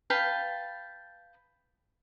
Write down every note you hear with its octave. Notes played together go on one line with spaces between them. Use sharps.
B4 F5 G5 A5